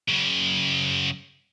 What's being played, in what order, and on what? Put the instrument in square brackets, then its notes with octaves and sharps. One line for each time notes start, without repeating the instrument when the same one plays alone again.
[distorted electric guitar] F#2 C#3